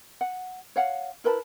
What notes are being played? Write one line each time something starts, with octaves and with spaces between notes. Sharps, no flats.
F#5
C#5 F5 F#5
E4 A#4 B4 A5